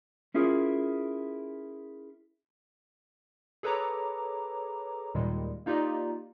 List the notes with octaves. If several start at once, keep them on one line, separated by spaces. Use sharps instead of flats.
C#4 E4 F4 G#4 A#4
G#4 A4 B4 C#5 A#5 D6
D#2 A#2 D#3 G3 G#3
A#3 D#4 F4 G4 D5 D#5